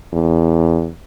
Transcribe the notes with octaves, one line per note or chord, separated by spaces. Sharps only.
E2